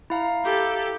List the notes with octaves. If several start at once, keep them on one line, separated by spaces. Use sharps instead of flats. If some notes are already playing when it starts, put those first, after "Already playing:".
E4 F5 A#5
G4 A4